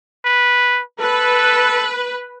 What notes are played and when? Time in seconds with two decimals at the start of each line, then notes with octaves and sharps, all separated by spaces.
0.25 B4
1.00 A4 B4